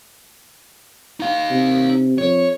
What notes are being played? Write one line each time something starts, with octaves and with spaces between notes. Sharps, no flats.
D#4 F5
C3
F2 C#5